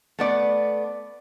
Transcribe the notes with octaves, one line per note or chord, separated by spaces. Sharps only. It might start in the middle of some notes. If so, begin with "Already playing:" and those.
A3 B3 D5